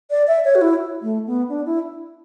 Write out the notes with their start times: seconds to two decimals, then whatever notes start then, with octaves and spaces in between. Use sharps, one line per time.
0.10 D5
0.27 E5
0.45 C#5
0.55 F#4
0.61 E4
1.02 A3
1.26 B3
1.49 D4
1.66 E4